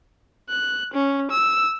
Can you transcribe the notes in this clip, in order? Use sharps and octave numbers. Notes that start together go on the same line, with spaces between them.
F#6
C#4
E6